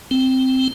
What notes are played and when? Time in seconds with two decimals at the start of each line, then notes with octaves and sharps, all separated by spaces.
0.11 C4